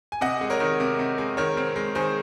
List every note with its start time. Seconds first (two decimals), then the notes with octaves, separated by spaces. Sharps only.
0.12 G#5
0.21 C3 D#5 F#5
0.41 G#3
0.50 A#4 C#5
0.60 D#3
0.80 C3
0.99 C3
1.18 G#3
1.37 D#3 A#4 C#5
1.57 C4
1.76 G#3
1.95 D#3 G#4 C5